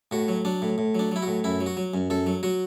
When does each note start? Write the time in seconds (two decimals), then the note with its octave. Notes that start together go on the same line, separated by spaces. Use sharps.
0.11 A2 F#4
0.28 F#3
0.45 F#3 D4
0.62 A2
0.78 A2
0.95 F#3 D4
1.12 F#3 E4
1.22 A2 F#4
1.44 F#2 E4
1.60 F#3
1.66 F#4
1.77 F#3
1.94 F#2
2.10 F#2 A4
2.26 F#3
2.43 F#3 F#4